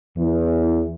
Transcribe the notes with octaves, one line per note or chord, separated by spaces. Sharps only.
E2